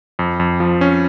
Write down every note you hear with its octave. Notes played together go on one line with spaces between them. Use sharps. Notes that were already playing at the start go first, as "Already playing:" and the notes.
F2
F2
F3
C#4